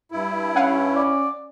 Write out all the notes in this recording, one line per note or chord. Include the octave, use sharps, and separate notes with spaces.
G2 E4
C#4 F5 F#5 G#5
D5